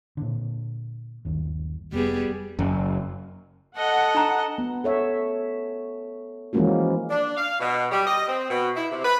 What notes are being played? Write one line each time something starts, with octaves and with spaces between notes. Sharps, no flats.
A#2 D3
G1 D#2
F1 G3 B3 G#4
F#1 F#2
A4 D#5 F#5
D4 A#5
B3
A4 C#5 E5
E3 F3 G#3 A#3 C#4 F#4
D4
F5
B2
G3
D#5
C4
B2
E4
C3
B4